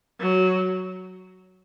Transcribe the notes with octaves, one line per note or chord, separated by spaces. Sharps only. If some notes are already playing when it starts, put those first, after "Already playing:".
F#3